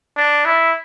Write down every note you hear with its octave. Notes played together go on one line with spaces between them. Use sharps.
D4
E4